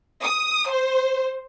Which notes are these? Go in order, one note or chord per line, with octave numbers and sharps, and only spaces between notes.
D#6
C5